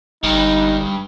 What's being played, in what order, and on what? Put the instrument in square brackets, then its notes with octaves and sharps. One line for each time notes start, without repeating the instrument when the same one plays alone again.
[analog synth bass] G1 [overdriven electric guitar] G2 [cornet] D#4